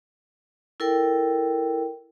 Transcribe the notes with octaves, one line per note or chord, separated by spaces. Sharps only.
E4 A4 A#4 G5